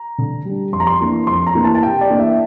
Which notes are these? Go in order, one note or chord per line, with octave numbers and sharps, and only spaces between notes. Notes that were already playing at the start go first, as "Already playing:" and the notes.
Already playing: A#5
D3
G3 D4
F2 C6
A#5
C6
E3 A#3 D4
F2 C6
A#5
E3 A#3 D4
A5
A5
C3 G5
D5
E3 A#3 D4
E5